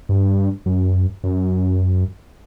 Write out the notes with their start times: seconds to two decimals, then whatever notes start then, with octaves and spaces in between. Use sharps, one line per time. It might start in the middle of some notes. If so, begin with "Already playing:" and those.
0.09 G2
0.66 F#2
1.24 F#2